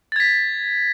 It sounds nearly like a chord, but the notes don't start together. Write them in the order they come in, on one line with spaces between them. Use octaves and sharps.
A6 G#6 B6